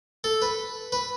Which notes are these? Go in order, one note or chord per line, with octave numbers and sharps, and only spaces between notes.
A4
B4
B4